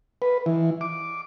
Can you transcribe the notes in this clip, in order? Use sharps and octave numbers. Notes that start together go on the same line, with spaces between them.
B4
E3
D6